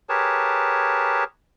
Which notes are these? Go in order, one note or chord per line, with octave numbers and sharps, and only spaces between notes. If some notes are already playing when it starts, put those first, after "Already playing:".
G4 G#4 A#4 B4 C#5 A5